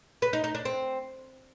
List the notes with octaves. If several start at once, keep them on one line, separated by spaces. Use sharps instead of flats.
B4
D#4
D#4
D4
C4